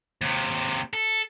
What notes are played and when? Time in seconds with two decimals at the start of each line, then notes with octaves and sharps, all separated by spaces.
0.21 D#2 C3
0.93 A4